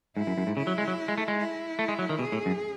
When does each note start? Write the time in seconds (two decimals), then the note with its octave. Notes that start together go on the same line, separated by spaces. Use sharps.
0.16 G#2 E4
0.27 F#2
0.38 F#2
0.47 G#2
0.57 C#3 E4
0.67 F#3
0.78 G#3
0.88 F#3
1.08 G#3
1.18 A3
1.28 G#3
1.38 E4
1.79 A3
1.88 G#3
1.99 F#3
2.09 D#3
2.19 B2 G#4
2.32 A2
2.46 F#2